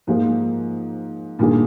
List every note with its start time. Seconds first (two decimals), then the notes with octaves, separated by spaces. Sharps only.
0.07 G#2 F3 A#3 F4 G#4
1.39 G2 A#2 D#3 A#3 F4 G#4